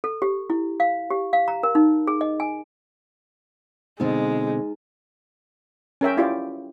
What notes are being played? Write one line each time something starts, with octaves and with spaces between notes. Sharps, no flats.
A4
G4
E4
F5
G4
F5
A#5
A#4
D#4
G#4
D#5
G#5
B2 D3 G#3 C4 D#4
C#4 A#4 E5 G5
E4 F4 G4 D5